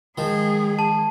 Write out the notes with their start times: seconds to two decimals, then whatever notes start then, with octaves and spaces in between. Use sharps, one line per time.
0.18 D#3 F3 G#3 G#4
0.79 A5